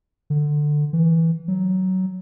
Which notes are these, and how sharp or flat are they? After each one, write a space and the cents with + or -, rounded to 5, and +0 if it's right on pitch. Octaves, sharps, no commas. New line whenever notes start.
D3 +15
E3 -5
F#3 +15